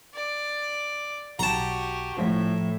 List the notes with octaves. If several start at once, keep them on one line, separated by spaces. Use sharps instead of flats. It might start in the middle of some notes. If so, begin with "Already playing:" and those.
D5
B1 F#4 G4 A5 A#5
A2 F3 E5